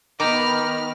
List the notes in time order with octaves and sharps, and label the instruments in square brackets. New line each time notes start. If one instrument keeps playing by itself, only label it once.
[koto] D#3 [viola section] B3 B5 [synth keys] G5 A#5 D6 [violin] F6